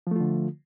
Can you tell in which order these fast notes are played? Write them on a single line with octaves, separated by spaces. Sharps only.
F3 A3 F4 D3